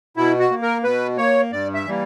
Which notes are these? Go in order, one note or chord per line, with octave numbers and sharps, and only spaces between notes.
B2 E4
F#4
A#3
A#4
B2 B4
A#3 C#5
G2 D5
E5
E3 G3 A#3